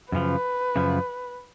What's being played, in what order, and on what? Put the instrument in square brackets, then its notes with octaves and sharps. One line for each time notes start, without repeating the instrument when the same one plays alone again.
[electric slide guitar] F#2 C#3 F3 [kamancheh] B4
[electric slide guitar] F#2 C#3 F3